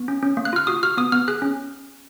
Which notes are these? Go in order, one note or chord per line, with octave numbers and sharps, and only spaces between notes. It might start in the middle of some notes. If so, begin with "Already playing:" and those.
Already playing: B3
C#4
C#4
A#3
F#6
F4 F6
F#4 D#6
F#4 F6
B3 D#6
B3 F6
G#4 F#6
C#4